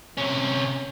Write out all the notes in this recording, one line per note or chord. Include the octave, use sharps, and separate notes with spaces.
C3 C#4